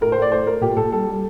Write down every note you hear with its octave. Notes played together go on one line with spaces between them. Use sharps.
A2 A#4
A2 C5
D5
A3 C5
A3 A#4
A#2 G4
A#2 A4
G3 A4
G3